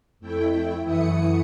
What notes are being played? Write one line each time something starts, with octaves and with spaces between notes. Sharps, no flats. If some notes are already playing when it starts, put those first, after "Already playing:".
F2 A3 E4 G5
F#2 E3 A3 E4 D#6 C#7